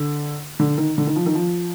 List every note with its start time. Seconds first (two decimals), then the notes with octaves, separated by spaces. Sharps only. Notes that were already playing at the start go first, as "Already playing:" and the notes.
Already playing: D3
0.60 D3
0.78 D#3
0.98 D3
1.07 D#3
1.16 F3
1.26 D#3
1.35 F3